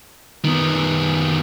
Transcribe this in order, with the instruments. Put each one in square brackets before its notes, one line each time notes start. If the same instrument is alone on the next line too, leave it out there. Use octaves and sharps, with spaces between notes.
[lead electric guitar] D#3 B3